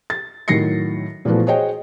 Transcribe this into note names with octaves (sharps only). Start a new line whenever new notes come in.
A6
A2 D#3 F#3 A#6 C7 C#7
A#2 E3 F3 A3 B3 F#4
F#4 G#4 C5 C#5 D#5 G5